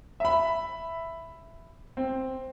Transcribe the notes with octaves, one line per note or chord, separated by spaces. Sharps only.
E5 B5
C4